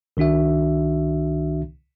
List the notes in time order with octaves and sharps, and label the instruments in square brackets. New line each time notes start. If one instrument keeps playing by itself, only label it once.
[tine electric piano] C2 D#3 D4 F#4 E5